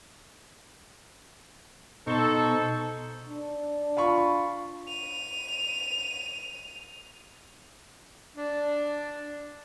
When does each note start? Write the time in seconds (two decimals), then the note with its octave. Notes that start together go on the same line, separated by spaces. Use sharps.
2.07 B2 D#4 A4 C5 C#6
3.29 D4
3.97 F4 B5 C#6
4.87 D#7 F7
8.36 D4